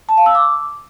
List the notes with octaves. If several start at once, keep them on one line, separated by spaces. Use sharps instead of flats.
A5
F5
E6
D6